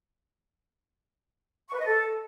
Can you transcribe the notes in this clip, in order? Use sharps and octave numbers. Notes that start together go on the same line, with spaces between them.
C#6
B4
D#5
A4